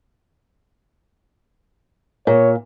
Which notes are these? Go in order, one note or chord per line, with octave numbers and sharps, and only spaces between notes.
A#2 C#5